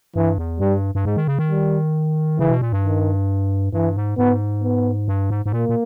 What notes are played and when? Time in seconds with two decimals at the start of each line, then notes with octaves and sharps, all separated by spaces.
0.16 G2 E3
0.38 E2
0.60 G2 G3
0.95 G2
1.05 G#2 G#3
1.17 D#3
1.27 C#3
1.39 D#3
1.50 G3
2.39 C#3 E3
2.50 B2
2.61 A#2
2.72 G2
2.84 D#3
3.73 G2 E3
3.97 G#2
4.18 G#2 B3
4.64 B3
5.08 G2
5.30 G#2
5.46 G#2
5.52 A#2 A#3
5.69 A#2